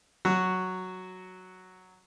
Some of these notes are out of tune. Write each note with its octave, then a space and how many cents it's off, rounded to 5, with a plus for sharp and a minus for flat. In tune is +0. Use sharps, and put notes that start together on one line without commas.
F#3 +0 F#4 +0